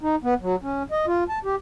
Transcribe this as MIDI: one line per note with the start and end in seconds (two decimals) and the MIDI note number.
0.01 0.16 63
0.24 0.34 59
0.41 0.56 54
0.63 0.83 61
0.91 1.06 75
1.07 1.24 65
1.29 1.39 81
1.45 1.56 67